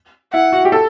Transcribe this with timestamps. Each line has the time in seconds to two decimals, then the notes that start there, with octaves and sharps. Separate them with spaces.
0.33 E4 F#5
0.53 F#4
0.65 G4
0.72 A4